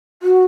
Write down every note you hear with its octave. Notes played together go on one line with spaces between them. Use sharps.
F#4